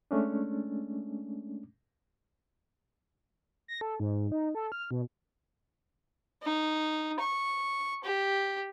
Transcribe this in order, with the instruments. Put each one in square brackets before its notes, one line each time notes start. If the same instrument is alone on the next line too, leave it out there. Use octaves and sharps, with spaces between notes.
[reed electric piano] G#3 A3 C#4 D4
[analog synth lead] A#6
A4
G#2
D#4
A4
F6
B2
[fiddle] D#4
C#6
G4